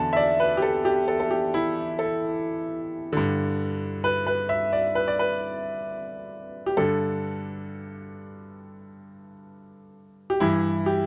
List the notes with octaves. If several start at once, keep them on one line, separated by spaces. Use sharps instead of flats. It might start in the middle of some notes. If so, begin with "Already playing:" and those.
Already playing: E2 D3 A5
E5
D5
B4
G4
A4
G4
A4
A4
G4
E4
A4
G2 D3
B4
B4
E5
D5
B4
D5
B4
G4
G2 D3 A4
G4
G2 E3 E4
G4